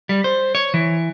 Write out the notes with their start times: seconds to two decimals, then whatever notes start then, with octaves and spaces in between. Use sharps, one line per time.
0.09 G3
0.24 C5
0.55 C#5
0.74 E3